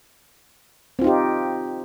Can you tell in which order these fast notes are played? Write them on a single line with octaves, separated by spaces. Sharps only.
C4 F4 D#4 G4